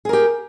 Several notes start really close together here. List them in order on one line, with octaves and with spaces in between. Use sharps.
G#4 A#4 G4